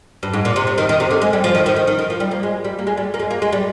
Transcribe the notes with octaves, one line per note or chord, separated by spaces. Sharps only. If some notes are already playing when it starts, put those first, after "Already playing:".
G2
G#2
A#2
C3
C3
D#3
D#3
C3
D3
G#3
G3
F3
D#3
D#3
D#3
D#3
D#3
F3
G3
A#3
G#3
G3
A#3
G#3
G3
A#3
G#3
A#3
G#3
G3